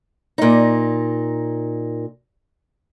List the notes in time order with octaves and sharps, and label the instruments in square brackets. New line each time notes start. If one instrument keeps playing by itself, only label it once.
[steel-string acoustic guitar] A#2 D#4